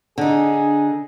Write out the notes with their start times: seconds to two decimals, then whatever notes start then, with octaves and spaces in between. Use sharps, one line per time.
0.18 D3 D4 D#4 G#4